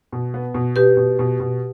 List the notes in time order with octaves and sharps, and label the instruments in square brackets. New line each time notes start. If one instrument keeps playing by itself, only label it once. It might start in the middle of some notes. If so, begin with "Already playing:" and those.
[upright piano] B2
B3
B2
[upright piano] B2 [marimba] G4 B4
[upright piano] B2
B2
B2